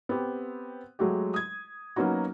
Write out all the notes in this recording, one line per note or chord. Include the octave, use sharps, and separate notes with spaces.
B3 C4 G4
F#3 G#3 A3 F#4 G4
D#6 G#6
F#3 A#3 B3 C#4 D#4 F#4